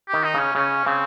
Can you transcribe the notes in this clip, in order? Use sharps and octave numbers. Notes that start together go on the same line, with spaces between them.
D#3 G4
D#4
C#3 C#4
C#3 C#4
C#3 C4